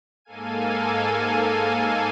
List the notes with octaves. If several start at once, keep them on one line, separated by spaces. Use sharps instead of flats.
G#2 A#3 A4 F5 G#5 D#7